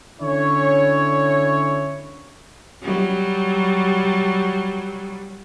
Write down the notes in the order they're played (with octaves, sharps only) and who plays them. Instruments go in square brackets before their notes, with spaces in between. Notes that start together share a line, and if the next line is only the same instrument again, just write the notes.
[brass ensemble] D3 C#4 E4 C#5
[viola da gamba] F#3 G3